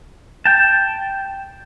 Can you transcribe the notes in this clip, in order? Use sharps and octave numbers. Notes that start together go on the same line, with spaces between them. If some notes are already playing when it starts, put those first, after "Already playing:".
G5 A5